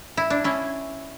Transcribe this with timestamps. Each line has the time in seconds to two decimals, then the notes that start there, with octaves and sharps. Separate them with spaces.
0.17 E4
0.30 D4
0.44 C#4 E4